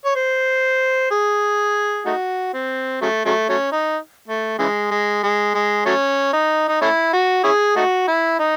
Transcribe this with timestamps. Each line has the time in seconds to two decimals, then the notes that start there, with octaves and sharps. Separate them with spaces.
0.05 C#5
0.16 C5
1.11 G#4
2.06 A3 D#4 F#4
2.54 C4
3.02 C#3 F#3 A3
3.25 C#3 F#3 A3
3.49 F#3 A3 C#4
3.72 D#4
4.28 A3
4.59 C#3 E3 G#3
4.91 G#3
5.23 G#3
5.55 G#3
5.86 F#3 A3 C#4
6.33 D#4
6.68 D#4
6.81 A3 C#4 E4
7.13 F#4
7.44 C#4 E4 G#4
7.76 A3 D#4 F#4
8.08 E4
8.40 D#4